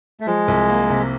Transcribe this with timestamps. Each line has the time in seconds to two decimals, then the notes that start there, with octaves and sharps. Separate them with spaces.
0.20 A3
0.26 F3 G#3
0.48 C2
0.69 A#3
0.90 C3